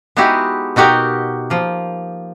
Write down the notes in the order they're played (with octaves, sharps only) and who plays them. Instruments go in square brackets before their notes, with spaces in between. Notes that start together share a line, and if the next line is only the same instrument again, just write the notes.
[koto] G#3 B3 D#4 E4 F#4 G4
B2 D#4 F#4 G4 A#4
F3 A#3